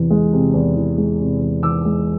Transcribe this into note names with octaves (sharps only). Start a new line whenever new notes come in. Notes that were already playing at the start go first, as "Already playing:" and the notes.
Already playing: E2 C3 E3
G#3
C3
E2
E3
G#3
C3
E2
E3 D6 E6
G#3